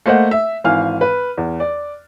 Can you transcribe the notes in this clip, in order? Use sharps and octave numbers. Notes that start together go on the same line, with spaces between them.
A3 A#3 C5 D#5 F#5
E5
G#1 E3 F5 G#5 F6
B4
E2
D5